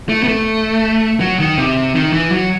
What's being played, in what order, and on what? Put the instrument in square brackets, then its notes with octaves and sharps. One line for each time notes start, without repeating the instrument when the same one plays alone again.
[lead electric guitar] A3
B3
A3
F#3
D#3
C3
D#3
E3
F#3